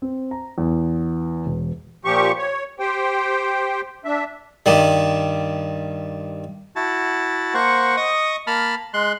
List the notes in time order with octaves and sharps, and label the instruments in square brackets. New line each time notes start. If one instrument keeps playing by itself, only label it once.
[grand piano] C4
A#5
E2
E1
[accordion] A#2 F3 G4 C#6
C#5
G4 C5 G5
D4 E5
[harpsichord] G2 D#3 G3
[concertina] E4 F#4 A5
A#3 C5 F#5 C#6
D#5 C#6 D#6
A#3 A5 B5 F6
G#3 C6 F#6